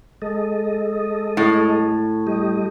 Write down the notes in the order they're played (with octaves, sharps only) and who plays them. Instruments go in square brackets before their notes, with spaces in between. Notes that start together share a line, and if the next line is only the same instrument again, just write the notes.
[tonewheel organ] G#3 A4 D#5
[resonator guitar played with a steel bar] A2
[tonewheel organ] G3 G4 D#5